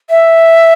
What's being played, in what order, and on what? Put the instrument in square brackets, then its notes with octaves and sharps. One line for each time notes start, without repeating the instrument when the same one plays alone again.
[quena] E5